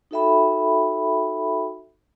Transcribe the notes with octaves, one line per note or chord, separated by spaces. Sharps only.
D#4 F#4 A4 E5 G5 B5